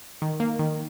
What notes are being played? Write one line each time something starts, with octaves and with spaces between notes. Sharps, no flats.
D#3
A#3
D#3